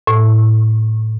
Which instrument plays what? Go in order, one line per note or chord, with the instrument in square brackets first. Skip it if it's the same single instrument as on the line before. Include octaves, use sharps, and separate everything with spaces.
[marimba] A2